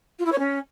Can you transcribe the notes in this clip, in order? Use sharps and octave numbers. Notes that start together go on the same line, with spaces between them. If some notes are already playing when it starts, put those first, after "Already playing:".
F4
E4
C#5
C#4